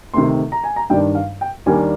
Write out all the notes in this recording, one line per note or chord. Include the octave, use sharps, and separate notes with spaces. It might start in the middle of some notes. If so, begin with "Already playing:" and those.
D2 C3 D#3 C6
A#5
G#5
A#5
G2 D#3 G3 D4 G5
F5
G5
D#2 D#3 G3 A#3 D4 G#5